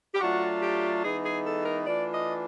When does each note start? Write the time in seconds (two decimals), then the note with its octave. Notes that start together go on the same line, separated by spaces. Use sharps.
0.14 G4
0.21 F#3 A3 D4 F4 F#4
0.63 G4
1.04 E3 G#3 B3 D#4 G#4
1.25 G#4
1.46 A4
1.65 A#4
1.86 E3 A3 D4 F4 D5
2.14 D#5